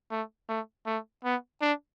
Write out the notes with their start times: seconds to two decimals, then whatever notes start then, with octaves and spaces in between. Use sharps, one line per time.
0.11 A3
0.49 A3
0.86 A3
1.24 B3
1.61 D4